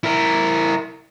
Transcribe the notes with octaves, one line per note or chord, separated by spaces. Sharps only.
E4 A#4